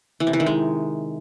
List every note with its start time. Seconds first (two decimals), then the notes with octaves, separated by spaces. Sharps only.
0.20 E3
0.27 C3
0.33 E3
0.40 D#3
0.46 G#3